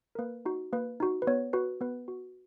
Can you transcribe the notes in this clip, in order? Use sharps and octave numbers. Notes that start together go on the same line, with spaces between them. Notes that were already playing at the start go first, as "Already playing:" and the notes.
A#4
A#3 B4
D#4 F#4
A#3 B4
D#4 F#4
B4
B3 C#5
F#4 B4
B3 B4
F#4